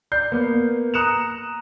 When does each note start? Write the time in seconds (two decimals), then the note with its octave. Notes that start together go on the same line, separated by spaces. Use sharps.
0.12 D5 G6 C7
0.32 A#3 B3
0.94 A#5 D#6 F#6 C#7 E7 F7